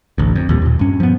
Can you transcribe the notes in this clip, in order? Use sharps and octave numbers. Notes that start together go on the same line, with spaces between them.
A1 D2
F2
D#2 A#2 G3
D#2 A#2
G2 C#4
F3 B3